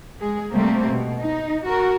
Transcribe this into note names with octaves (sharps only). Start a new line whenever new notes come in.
G#3 G#4
C3 G3 A3 A#3 C4
B2
D#4
F#4 A#4